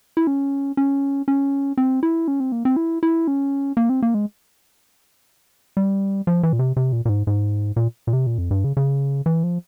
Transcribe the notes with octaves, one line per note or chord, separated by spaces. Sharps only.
E4
C#4
C#4
C#4
C4
E4
C#4
C4
A#3
C4
E4
E4
C#4
A#3
C4
A#3
G#3
G3
F3
E3
A#2
C3
C3
A#2
A#2
G#2
G#2
A#2
A#2
C3
A#2
F2
G2
C#3
C#3
E3
F3